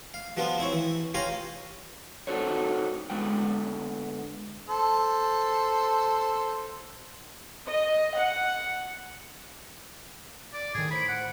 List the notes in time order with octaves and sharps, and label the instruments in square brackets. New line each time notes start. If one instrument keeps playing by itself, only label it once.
[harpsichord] F5
F3 G3 B3 D4 F4
C4 E4 C#5
E3
C#4 F4 G4 F5 G#5 A#5
[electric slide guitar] C4 D#4 F#4 A4 C5 C#5
D3 G#3 B3 G5
[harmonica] A4 C5
[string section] D#5
F#5
[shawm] D5
[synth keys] A2 D#3 [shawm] G#4
[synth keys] A2 C5 D7 [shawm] B5
[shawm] F#5